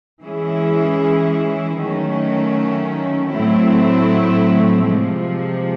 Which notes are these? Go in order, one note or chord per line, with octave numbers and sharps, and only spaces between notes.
E3 G#3 C#4 E4 G#4
D#3 F#3 A3 C#4
A2 F#3 A3 C4 E4
C3 F3 G#3